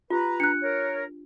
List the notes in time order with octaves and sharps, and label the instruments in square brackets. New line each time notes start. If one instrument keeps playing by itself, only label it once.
[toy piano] F4 G4 [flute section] B4 A#5
[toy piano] D4 [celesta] F#6 C#7
[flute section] A#4 C#5